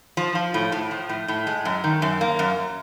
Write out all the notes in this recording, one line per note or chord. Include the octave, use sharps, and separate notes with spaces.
F3
F3
A2
A2
F3
A2
A2
G#3
F#2
D#3
F#2
A#3
F#2